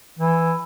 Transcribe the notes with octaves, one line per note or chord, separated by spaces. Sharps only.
E3